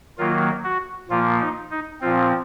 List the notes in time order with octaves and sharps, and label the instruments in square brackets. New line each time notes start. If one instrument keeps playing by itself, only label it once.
[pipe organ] D#3 F#3 A#3 F4
F#4
A#2 F3 A#3 F4
D#4
D#4
A#2 F3 C4 F4